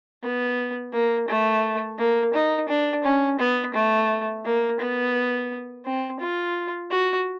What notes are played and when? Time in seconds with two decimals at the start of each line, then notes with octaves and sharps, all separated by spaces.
0.23 B3
0.93 A#3
1.28 A3
1.98 A#3
2.34 D#4
2.68 D4
3.04 C#4
3.39 B3
3.74 A3
4.45 A#3
4.80 B3
5.85 C4
6.20 F4
6.91 F#4